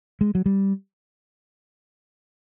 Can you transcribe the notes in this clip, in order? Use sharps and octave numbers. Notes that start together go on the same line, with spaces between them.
G#3
F#3
G3